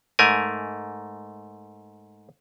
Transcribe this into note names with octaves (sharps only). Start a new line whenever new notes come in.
G#2 A3 A#4 G#5